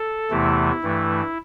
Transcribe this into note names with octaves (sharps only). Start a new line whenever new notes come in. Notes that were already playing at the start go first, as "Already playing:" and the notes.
Already playing: A4
E2 C3 E3 A3 E4
G2 E3 A3